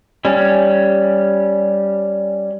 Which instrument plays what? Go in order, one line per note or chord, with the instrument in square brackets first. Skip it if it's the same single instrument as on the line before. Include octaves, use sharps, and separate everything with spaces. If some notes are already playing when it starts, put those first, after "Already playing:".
[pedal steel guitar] G3 C#4